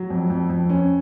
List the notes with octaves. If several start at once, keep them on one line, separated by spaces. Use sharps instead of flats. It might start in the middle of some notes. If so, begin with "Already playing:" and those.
Already playing: F#3
F2
F2
F2
C#4